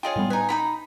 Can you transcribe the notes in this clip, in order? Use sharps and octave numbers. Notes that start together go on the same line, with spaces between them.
F4 G#4 C#5 D#5 F5 G5
A2 G3 B3
D#4 B4 G#5
D#4 F#4 A#5 B5